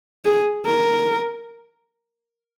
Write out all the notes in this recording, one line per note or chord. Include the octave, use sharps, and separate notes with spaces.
G#4
A#4